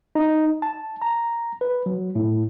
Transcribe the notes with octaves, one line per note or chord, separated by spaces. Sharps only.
D#4
A5
A#5
B4
F#3
A2